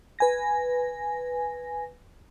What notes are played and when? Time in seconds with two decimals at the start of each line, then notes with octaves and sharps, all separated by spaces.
0.19 B4 G#5 A#6